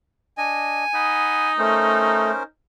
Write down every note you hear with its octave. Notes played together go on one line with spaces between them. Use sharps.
D4 D#5 G#5
D#4 F#5 B5 D#6
A3 C#4 A#4 C5